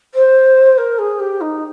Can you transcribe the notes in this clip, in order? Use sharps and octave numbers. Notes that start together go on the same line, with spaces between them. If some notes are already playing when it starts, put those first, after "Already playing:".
C5
A#4
G#4
G4
D#4